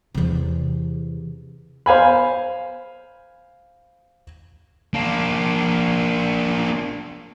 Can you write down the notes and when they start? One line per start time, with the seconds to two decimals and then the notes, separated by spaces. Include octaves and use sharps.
0.14 E2 C3
1.86 C5 F5 G#5 B5
4.94 A#3 D4